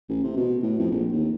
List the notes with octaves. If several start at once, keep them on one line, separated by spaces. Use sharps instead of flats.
A1
C3
B2
A2
F2
A#1
D#2